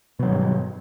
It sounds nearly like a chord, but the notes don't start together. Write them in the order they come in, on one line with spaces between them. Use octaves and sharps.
B2 F#3 D#3 G2